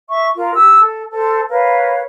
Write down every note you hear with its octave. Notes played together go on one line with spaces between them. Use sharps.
E5 C#6
F4 A#4
G4 E6
A4
A4 C5
A#4 B4 C#5 F5